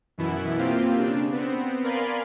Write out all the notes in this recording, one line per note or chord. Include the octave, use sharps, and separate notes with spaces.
F#2 B2 E3 B3 E4
A#3 C4 F4 G4
C#3 D4
B3 C4
A#4 D5 F5 G#5 B5 C6